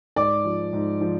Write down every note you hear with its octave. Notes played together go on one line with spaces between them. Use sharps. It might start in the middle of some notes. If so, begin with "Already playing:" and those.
G#2 D5 D6
F3
G#2
F3